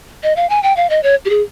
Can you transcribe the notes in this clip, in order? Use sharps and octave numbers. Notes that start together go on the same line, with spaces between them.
D#5
F5
G#5
G5
F5
D#5
C#5
G4
G#4